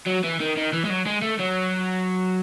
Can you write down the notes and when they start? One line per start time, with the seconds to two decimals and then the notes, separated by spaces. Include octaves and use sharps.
0.06 F#3
0.24 E3
0.40 D#3
0.57 D#3
0.73 E3
0.85 G#3
0.90 F#3
1.06 G#3
1.22 A3
1.39 F#3